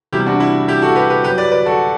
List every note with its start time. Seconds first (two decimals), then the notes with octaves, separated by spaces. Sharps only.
0.12 E2 C3 G3 E4 G4
0.26 D4 F#4
0.40 E4
0.68 E4 G4
0.82 F#4 A4
0.96 G4 B4
1.10 G4 B4
1.24 F#2 G4 B4
1.28 F#3
1.38 B4 D5
1.52 B4 D5
1.66 F#4 A4